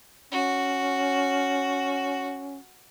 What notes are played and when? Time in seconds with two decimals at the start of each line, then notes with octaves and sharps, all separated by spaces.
0.32 C#4 F#4